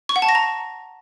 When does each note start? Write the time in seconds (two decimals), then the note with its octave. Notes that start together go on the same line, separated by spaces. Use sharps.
0.09 C#6
0.16 F#5
0.22 A5
0.29 A#6
0.35 A#5